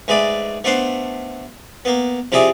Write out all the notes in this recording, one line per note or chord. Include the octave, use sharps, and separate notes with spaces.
G#2 G#3 A3 B4 D5
A3 B3 D4 C5 F5 F#5
A#3 B3
C3 F3 E4 G#4 D5 G#5